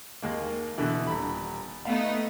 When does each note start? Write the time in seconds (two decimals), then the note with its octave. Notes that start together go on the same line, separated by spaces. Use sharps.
0.22 D#2 G#3 A#3
0.78 B2 D3 E3
1.07 D#1 B5
1.85 A3 B3 D#4 F5